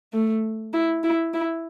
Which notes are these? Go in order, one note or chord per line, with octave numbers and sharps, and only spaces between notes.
A3
E4
E4
E4